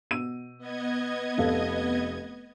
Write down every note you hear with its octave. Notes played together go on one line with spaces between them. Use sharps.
B2 E6 D#7
B3 D#5 G#6
F1 A4 F5